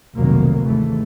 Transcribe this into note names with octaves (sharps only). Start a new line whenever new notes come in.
F1 C2 B2 D#3 F#3 A#3
D#2 G#2 E3 A3